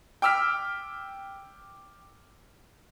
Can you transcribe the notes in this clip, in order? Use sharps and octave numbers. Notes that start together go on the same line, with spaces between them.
G5 D6 E6 F6 B6